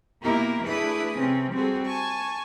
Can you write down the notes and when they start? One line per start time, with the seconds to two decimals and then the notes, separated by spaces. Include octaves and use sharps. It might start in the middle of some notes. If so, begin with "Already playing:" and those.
0.21 B2 A#3 E4 G4 A#4
0.65 A3 D4 E4 G#4 B4 D#6
1.17 C3 C4 C#4
1.52 G3 C4 F#4 G#4 A4
1.85 G#5 A5 C#6